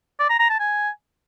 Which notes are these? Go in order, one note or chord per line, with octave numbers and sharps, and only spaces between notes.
D5
A#5
A#5
A5
G#5